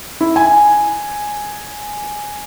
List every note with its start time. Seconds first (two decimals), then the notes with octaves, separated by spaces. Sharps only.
0.21 E4
0.36 G#5